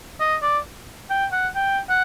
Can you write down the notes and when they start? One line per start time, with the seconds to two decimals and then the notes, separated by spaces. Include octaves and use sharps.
0.20 D#5
0.42 D5
1.10 G5
1.32 F#5
1.55 G5
1.89 F#5